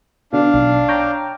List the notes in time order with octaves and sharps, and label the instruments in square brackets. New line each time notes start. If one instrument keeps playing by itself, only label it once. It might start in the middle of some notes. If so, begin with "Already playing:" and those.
[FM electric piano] B2 D3 [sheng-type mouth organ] D4 F5
[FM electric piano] B1
C#5 G5 A#5